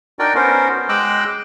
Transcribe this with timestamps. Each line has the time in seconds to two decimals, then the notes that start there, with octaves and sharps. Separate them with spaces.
0.19 D4 D#4 F#4 A#4 D5 G5
0.35 B3 C#4 F#4 A#4 C5
0.89 G#3 D#5 G5 D6 E6 F#6